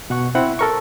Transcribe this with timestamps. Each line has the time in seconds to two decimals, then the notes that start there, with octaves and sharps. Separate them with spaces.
0.10 B2 F#5 C#6
0.35 C4 E4 F#5
0.59 A4 A#4 C#6